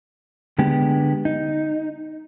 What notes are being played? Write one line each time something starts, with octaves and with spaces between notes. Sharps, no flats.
D3 G#3 B3 G4
D#4